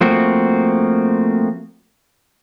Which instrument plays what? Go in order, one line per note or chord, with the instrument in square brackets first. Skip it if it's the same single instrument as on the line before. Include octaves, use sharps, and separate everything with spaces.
[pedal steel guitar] F3 A3 A#3 C4 F#4